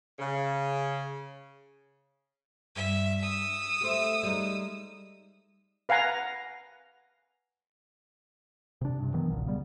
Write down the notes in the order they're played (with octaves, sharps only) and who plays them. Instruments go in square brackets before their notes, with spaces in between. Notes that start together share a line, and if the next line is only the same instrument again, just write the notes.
[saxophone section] C#3
[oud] G2 [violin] E5
[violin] D#6 E6
[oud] G3 A3 C4
G3 G#3 D#4
[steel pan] B4 F5 F#5 G#5 A#5
[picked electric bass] C3 D4
G2 C3
D#3 E3 F#3 B3
F1 B1 A#2 C#3
C#3 G3 B3